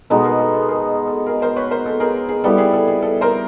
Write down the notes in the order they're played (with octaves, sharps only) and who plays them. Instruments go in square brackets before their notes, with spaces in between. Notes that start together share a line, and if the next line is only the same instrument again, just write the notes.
[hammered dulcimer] B2 G#3 B3 D#4 [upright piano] A4
[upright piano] G#4 A#4
A4
A4
G#4 A#4
A4
G#4 A#4
A#4 C5
B4 C#5
A#4 C5
A4
G#4 A#4
G#4
[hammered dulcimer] G3 B3 E4 [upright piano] A4
[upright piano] G#4
A4
G#4
A4
A#4 C5